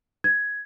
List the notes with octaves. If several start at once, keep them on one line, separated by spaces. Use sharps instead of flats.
G#6